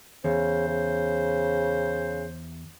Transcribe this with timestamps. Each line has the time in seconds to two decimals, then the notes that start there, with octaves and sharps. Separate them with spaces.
0.24 E2 C#3 C5
0.68 C#3